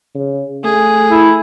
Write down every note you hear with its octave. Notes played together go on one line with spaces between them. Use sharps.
C#3
A3 G#4
E4